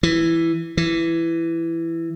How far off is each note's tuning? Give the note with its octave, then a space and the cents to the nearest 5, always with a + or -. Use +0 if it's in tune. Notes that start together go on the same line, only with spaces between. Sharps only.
E3 +5
E3 +10